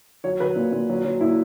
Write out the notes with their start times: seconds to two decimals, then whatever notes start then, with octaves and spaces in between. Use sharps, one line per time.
0.24 F#3 C#5
0.40 F#3 B4
0.56 A#2
0.72 A#2
0.89 F#3
1.05 F#3
1.21 A#2 E4